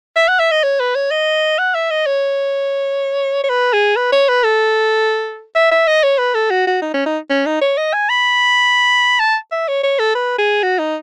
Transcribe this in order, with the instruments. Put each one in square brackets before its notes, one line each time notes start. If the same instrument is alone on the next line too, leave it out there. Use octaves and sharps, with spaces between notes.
[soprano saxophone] E5
F#5
E5
D#5
C#5
B4
C#5
D#5
F#5
E5
D#5
C#5
C#5
B4
G#4
B4
C#5
B4
A4
E5
E5
D#5
C#5
B4
A4
F#4
F#4
D#4
C#4
D#4
C#4
D#4
C#5
D#5
G#5
B5
A5
E5
C#5
C#5
A4
B4
G#4
F#4
D#4